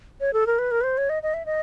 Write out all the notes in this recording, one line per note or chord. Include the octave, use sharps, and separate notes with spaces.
C#5
A4
A#4
B4
A#4
B4
C5
C#5
D#5
D#5
E5
D#5